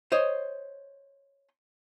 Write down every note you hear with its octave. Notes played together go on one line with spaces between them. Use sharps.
C5 C#5 D#5